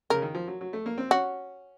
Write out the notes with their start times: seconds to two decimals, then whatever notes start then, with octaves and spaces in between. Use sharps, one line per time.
0.10 C#3 A#4
0.22 D#3
0.35 F3
0.48 F#3
0.61 F#3
0.73 A3
0.86 A#3
0.98 C4
1.11 C#4 F#4